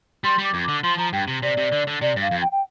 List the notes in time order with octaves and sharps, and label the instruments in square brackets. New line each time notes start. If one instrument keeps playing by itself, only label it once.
[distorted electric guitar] G3 [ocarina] C6
[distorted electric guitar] G3
[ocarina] D6
[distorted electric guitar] F2
[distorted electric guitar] D3 [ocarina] D6
[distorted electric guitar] F3 [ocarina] C6
[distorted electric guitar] F3 [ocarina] A#5
[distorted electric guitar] G2 [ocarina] G5
[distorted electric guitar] C3
[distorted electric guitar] C3 [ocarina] D5
[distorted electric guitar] C3
D3
D3
[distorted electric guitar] C3 [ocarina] D5
[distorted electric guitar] G2
[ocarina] F5
[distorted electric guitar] F2
[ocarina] G5
G5